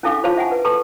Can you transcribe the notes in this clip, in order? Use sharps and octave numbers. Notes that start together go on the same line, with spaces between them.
C#4 D4 E4 A4 F5 D6
F4 C5 C#5 F5 A5 C#6
E5 F#5 G#5 A5
B4
A4 B4 A5 C#6